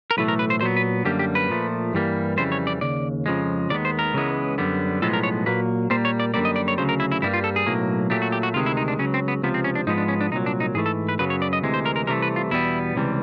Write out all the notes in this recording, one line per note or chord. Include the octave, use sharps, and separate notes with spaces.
A#4
B1 A2 E3 A3 B4
A#4
B4
C5
A#2 F#3 B3 C5
B4
F#2 D3 G3 A#3 G4
G4
B4
A#2 F3 A3
G2 E3 G3 A#3
F2 C#3 E3 G3 C5
C#5
D5
D#2 C#3 D5
F2 C#3 F3 G#3
D#2 D#3 G#3 B3 D5
C5
A#4
C#2 C#3 E3 G#3 B3
F#2 D3 G3 B3
B1 A2 F3 G#3 B3 A4
A#4
C#5
A#2 F#3 A#3 B4
A#2 G3 A#3 C5
C#5
D5
F#2 D3 G3 A#3 D5
D#5
D5
C#5
D2 C#3 F#3 C5
A#4
E4
E4
G2 D3 G3 A#3 E4
F4
A4
G#4
B1 A2 F#3 A#3
A#2 F#3 A3 G4
F#4
G4
F#4
D2 C3 D#3 G#3 F4
E4
D#4
D4
C#2 C#3 F#3 C#4
C4
B3
C#2 C3 F3 B3
C4
C#4
D4
G#2 F3 G#3 B3 D#4
D4
C#4
D4
C2 A#2 F#3 D#4
D4
D#4
G#2 E3 A3 G#4
A4
B4
F#2 C#3 F#3 B3 B4
C#5
D5
D#5
D2 C3 E3 G#3
C5
A#4
A#4
C2 C3 E3 A3 A#4
B4
F4
E2 B2 G3 B3 E4
C#2 C3 E3 G3